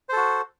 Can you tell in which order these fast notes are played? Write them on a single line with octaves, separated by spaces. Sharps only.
C5 A4 F#4